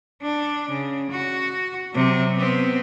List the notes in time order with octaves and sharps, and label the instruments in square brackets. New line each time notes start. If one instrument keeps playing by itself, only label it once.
[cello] D4
C#3
F#4
C3 F#3
B3 C4